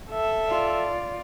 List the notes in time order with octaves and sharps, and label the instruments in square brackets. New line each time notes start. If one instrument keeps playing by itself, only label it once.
[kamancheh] A4 E5
[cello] F4 D5